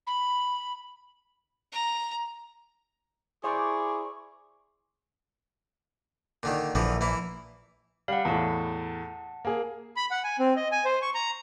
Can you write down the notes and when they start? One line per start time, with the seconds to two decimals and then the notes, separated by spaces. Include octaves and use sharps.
0.07 B5
1.72 A#5
3.44 E4 G#4 C5 D5 C#6 D6
6.43 A#2 D3 D#3
6.75 A#1 D3 E3 F3
7.01 E3 A#3 E4
8.08 G3 F5 F#5
8.25 E2 A2 F#5 A5
9.45 A#3 G#4
9.96 B5
10.11 F#5
10.24 G#5
10.39 C4
10.56 D#5
10.72 G#5
10.85 C5
11.02 C#6
11.15 A#5